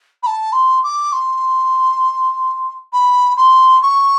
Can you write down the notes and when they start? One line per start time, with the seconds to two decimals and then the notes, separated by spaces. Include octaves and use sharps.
0.23 B5
0.27 A5
0.53 C6
0.84 D6
1.13 C6
2.93 B5
3.37 C6
3.82 C#6